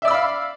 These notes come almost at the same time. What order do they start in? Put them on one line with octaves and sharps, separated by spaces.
E5 D5 E6 B5 F5